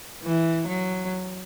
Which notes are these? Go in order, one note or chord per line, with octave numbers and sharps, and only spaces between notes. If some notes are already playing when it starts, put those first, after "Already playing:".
E3
F#3